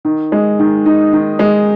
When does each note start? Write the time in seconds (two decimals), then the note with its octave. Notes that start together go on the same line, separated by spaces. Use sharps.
0.05 D#3
0.32 G#3
0.59 D#3
0.86 D#4
1.13 D#3
1.39 G#3